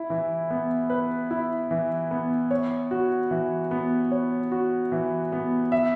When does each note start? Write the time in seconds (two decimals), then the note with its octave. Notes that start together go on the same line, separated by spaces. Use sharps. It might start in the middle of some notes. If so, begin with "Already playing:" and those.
Already playing: E4
0.10 E3
0.50 B3
0.90 B4
1.30 E4
1.71 E3
2.11 B3
2.51 C#5
2.91 F#4
3.31 E3
3.71 B3
4.11 C#5
4.52 F#4
4.92 E3
5.32 B3
5.72 E5